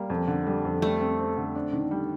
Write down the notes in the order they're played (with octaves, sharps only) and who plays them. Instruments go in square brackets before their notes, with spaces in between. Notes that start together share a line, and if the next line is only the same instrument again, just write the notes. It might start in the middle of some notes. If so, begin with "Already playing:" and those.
Already playing: [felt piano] G3 [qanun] A#3
[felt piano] F2
D3
G3
F2
[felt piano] G3 [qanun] A3
[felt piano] C4
C4
D3
D4
D#3
G3